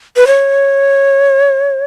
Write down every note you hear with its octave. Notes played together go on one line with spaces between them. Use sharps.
B4
C#5